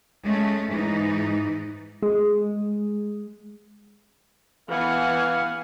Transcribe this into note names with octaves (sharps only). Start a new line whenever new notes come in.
G#3 A3 C#4
G#2 E3 D#4
G#3
E3 B3 F5 F#5 G#5